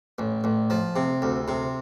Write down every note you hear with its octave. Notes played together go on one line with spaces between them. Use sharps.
A1
A1
F3
C3
D2
C3